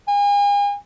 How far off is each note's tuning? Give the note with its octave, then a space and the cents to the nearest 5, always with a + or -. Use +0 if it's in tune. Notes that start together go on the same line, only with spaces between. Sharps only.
G#5 -40